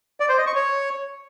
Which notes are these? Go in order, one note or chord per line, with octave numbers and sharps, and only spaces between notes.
D5
C5
D#5
C#6
C#5